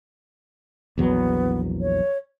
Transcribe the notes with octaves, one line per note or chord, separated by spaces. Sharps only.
A#1 E2 F#3 B3
C#5